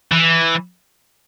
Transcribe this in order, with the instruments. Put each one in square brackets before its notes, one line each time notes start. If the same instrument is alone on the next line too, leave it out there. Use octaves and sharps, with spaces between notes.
[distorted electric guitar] E3